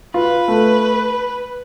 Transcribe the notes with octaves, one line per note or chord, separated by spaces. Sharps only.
F4 B4
A3